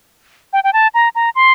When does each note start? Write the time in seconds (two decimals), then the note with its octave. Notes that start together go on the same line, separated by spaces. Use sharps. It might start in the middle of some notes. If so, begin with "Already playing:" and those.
0.53 G5
0.64 G5
0.73 A5
0.94 A#5
1.15 A#5
1.35 C6